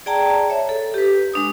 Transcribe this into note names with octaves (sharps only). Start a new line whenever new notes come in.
G#4 D5 G5 A5 A#5
C#5 E5
A4
G4 B4
G#3 D4 D#6